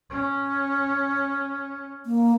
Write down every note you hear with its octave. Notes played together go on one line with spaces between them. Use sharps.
C#4
A#3